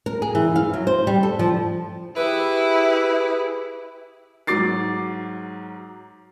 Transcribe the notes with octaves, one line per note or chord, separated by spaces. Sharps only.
A#4
G#4
E3
F5
F#3
C5
G3
A4
F3
E4 G4 G#4 B4
G#2 F#3 D6 A6 C7